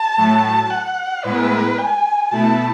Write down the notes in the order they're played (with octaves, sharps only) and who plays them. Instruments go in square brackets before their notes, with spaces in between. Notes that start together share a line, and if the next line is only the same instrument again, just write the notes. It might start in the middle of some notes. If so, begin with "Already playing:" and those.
Already playing: [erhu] A5
[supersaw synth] A2 F#3 A3
[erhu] F#5
[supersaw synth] A2 G#3 B3 E4 [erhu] B4
[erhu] G#5
[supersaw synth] B2 A3 E4 [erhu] A5